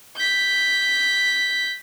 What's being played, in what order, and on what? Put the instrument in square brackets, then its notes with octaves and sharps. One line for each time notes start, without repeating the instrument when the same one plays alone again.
[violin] G6 B6